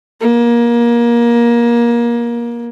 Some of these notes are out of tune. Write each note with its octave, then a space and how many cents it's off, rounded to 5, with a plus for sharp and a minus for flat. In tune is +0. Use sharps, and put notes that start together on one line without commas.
A#3 +25